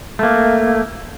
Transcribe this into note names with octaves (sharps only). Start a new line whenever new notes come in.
A3 A#3